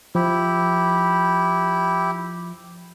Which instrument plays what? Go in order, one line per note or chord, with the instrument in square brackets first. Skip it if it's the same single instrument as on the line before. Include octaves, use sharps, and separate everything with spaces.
[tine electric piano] F3 [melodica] E4 G4